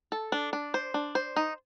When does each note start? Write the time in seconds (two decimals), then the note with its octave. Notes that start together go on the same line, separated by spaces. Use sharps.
0.12 A4
0.32 D4
0.53 D4
0.74 C5
0.94 D4
1.15 C5
1.36 D#4